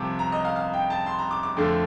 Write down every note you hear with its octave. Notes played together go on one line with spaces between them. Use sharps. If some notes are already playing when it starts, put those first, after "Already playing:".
Already playing: C2 C3 F3 D6
A#5
D#5
F5
F5
G5
A5
C6
A#5
D6
D6
F2 D3 F3 A3 D6